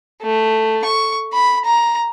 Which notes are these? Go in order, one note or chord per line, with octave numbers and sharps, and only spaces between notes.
A3
C#6
B5
A#5